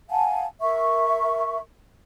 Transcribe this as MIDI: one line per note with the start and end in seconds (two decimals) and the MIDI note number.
0.10 0.45 77
0.10 0.45 78
0.10 0.45 80
0.10 0.45 81
0.61 1.58 70
0.61 1.58 76
0.61 1.58 85